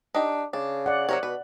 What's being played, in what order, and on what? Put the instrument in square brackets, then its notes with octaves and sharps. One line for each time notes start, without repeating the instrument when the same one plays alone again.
[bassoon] D4 [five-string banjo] D#4 G4
[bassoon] C#3 [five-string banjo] D4
[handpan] D5 F#5
[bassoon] C3 [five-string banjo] F#3 A#4 C#5
[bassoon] B2 [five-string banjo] B4